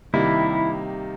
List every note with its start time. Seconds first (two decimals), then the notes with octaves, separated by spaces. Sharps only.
0.13 C3 D#3 G3 A#3 E4